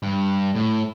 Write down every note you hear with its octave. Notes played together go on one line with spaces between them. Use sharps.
G2
A2